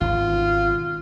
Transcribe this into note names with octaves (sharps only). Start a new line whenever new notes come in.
G#1 G#2 B2 F4